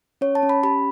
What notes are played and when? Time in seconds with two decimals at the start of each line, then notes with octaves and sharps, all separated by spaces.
0.21 C#4 C#5
0.35 A5
0.43 C#4
0.49 B5
0.63 G4 B5